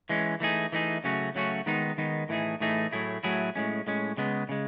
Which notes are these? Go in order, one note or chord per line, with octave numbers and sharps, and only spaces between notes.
E3 G#3 C#4
E3 A3 D#4 G#4
E3 A3 D#4 G#4
C#3 F#3 A3 C#4 F#4
C#3 F#3 A3 C#4 F#4
D#3 G#3 B3 D#4
D#3 G#3 B3 D#4
A2 E3 A3 D#4 G#4
A2 E3 A3 D#4 G#4
A2 F#3 A3 E4 G#4
A2 F#3 A3 E4 G#4
A2 G#3 C#4
A2 G#3 C#4
C#3 G#3 B3
C#3 G#3